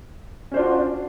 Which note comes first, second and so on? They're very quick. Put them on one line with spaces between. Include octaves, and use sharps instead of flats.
C#4 C5 D4 F4 F#4